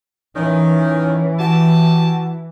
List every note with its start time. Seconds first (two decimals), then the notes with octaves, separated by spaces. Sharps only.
0.36 D#3 E3 C#4
1.39 F#4 G4 G#5 A5